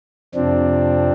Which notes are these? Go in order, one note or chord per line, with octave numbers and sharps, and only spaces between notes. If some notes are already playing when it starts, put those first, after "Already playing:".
F2 C3 F3 C4 D4